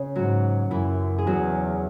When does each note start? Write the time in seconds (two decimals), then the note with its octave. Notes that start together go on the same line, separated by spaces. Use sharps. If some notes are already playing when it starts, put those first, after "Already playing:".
Already playing: C#3 C#4
0.16 G#2 F#3 F#4
0.71 F#2 E3 E4
1.18 G#4
1.26 E2 F#3 F#4